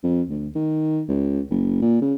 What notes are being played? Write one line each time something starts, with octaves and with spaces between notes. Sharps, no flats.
F2
D2
D#3
C#2
F#1
A#2
C#3